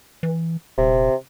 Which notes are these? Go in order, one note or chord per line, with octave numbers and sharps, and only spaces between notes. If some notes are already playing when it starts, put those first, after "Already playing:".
E3
D#1 C3